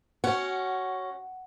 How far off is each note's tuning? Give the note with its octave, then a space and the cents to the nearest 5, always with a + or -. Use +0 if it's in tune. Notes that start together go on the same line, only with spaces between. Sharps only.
C#4 +0 F#4 +20 F#5 +10